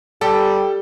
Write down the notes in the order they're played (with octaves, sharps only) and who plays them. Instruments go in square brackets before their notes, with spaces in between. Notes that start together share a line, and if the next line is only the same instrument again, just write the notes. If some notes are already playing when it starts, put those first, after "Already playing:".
[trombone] G3 [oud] G4 [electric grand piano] A4